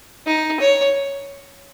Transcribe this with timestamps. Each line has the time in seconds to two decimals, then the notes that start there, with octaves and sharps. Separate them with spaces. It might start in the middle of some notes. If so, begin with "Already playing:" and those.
0.27 D#4
0.60 C#5